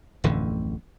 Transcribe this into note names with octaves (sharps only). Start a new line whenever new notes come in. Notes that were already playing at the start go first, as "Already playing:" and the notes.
D1 A1 F2 D3